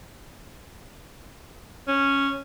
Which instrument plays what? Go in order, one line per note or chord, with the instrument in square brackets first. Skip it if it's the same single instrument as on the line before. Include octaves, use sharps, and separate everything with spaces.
[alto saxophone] C#4